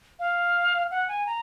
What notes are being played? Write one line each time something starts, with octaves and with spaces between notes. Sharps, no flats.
F5
F#5
G#5
A#5